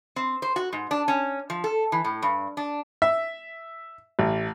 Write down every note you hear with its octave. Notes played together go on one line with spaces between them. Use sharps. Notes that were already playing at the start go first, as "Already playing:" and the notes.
C4
C5
F#4
G#2
D4
C#4
F3
A4
E3
A2
G2
D4
E5
A1